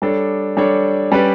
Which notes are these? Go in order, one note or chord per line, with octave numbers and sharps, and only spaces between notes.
G3 D4 A4 C#5
G3 D4 A4 C#5
G3 C#4 G4 B4 D5